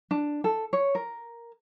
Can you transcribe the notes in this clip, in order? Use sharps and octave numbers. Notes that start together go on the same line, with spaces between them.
D4
A4
C#5
A#4